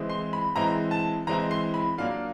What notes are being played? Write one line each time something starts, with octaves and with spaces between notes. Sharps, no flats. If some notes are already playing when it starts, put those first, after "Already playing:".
Already playing: E3 G#3 C4 E4
C6
B5
E3 G#3 C4 E4 A#5
A5
E3 G#3 C4 E4 A#5
C6
B5
F#3 A#3 D4 F4 F5